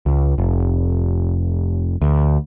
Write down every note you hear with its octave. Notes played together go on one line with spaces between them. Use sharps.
C#2
F1
D2